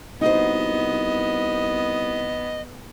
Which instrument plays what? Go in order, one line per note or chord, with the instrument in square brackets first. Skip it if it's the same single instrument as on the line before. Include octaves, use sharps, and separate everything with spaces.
[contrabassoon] C2 [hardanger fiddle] B3 [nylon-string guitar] D#4 F#4 C5 [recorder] D#5